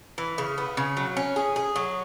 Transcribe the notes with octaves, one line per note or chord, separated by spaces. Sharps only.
E3
C#3
B3
C#3
F#3
C#4
G#4
G#4
F#3